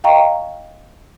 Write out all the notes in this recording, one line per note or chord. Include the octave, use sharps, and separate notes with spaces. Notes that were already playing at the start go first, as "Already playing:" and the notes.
D#5 F5 G5 A#5 C#6